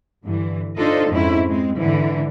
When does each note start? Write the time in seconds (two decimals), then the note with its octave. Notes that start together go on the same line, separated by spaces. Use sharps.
0.22 G2 D3 E3
0.77 D4 D#4 F4 A4 C5 D#5
1.10 F2 G#2 C4 C#4 E4
1.48 G#3 C4
1.77 G#2 D3 E3